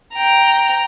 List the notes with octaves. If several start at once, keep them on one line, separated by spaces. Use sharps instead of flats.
G5 A#5